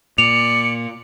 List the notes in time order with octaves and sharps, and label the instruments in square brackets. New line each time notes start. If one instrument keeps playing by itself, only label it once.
[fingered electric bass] A#2 [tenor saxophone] D5 [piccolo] C#7 [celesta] F7